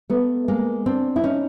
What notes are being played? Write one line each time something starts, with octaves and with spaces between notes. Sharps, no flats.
A3 B3
G#3 A#3
C4 D4
E4
C#4 D#4